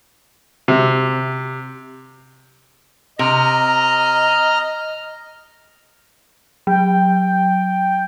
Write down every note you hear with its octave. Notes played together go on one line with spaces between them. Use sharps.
C3
C3 D#5 A#5 F6
F#3 G5